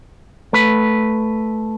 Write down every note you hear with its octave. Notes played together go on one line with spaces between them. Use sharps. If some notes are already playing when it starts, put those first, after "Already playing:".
A3 B4